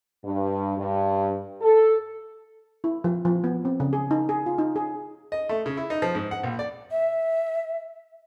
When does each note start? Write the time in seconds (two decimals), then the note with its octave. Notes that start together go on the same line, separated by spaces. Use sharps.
0.24 G2
0.78 G2
1.62 A4
2.84 E4
3.04 F3
3.25 F3
3.44 B3
3.65 C4
3.80 C#3
3.93 G#4
4.11 D#4
4.29 G#4
4.46 F4
4.58 D#4
4.76 G#4
5.32 D#5
5.49 A3
5.66 C#3
5.77 E4
5.90 D#4
6.02 F3
6.15 G#2
6.31 F#5
6.44 A#1
6.59 D5
6.91 E5